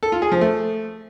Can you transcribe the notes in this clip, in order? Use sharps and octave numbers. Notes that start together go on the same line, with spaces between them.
A4
F4
G#4
F3
A3